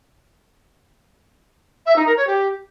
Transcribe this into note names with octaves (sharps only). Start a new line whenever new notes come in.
E5
D#4
A#4
C#5
G4